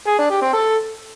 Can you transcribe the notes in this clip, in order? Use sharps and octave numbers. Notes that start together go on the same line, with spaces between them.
G#4
D4
G4
C4
A4